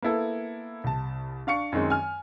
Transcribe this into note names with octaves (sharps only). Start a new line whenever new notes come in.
A#3 B3 E4 A4
C2 A5
D4 F5 C#6 C#7
F#2 D#3 G#3 C4
G#5 F6